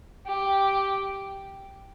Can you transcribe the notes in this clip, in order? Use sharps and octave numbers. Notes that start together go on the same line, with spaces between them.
G4